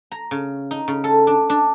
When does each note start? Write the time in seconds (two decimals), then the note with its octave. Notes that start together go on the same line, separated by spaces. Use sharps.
0.12 A#5
0.31 C#3
0.71 D#4
0.88 C#3
1.04 A4
1.27 D4
1.50 D4